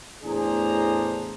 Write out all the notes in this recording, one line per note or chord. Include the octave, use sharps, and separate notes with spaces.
E2 A2 D4 G#4 C5 A#5